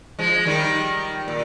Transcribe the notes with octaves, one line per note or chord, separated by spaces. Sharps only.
F3 G#3
D#3 G3
A#2